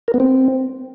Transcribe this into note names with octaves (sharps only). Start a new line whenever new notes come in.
A#4
B3
C4